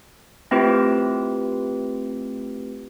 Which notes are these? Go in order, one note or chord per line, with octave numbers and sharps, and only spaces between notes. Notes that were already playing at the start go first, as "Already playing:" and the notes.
A3 C4 E4 F4 G4 B4